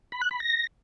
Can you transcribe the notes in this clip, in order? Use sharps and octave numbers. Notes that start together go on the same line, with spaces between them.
B5
F#6
B5
A#6